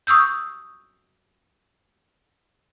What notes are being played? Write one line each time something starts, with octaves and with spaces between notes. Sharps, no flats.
C#6 D#6 E6 G6